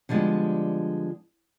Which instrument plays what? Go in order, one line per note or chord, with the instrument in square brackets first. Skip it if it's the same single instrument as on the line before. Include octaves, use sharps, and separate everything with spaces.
[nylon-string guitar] D3 F3 G3 G#3 B3